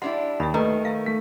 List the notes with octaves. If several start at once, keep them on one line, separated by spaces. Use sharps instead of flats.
G3 D4 E4 F#5 C6
D#2 E5 B5
D#3 A3 B4 A#5
E5 F5
A3 B6